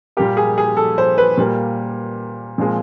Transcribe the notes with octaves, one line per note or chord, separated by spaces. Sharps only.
A#2 G3 A#3 G4
G#4
G#4
A4
C5
B4
A#2 G3 A#3
A#2 F3 G#3 C4